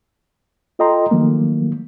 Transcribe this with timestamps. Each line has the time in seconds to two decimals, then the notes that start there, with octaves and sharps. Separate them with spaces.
0.79 F4 A4 D#5 G5 A#5 C6
1.11 D#3 F3 F#3 A3 A#3